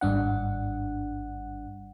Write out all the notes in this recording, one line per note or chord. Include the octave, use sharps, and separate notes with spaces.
G#1 G2 D4 F#5